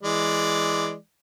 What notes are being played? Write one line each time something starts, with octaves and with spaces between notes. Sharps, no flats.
E3 G#3 D5